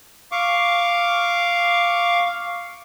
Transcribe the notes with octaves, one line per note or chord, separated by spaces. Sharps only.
F5 C#6 D6